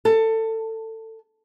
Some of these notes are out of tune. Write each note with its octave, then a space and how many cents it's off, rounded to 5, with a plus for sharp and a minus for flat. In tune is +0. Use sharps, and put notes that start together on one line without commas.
A4 +20